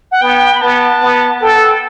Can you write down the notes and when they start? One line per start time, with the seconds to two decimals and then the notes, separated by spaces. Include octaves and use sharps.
0.11 F#5
0.21 B3 G5
0.55 B5
0.61 B3 A5
1.02 B3
1.42 A4 G5
1.55 F#5
1.69 G5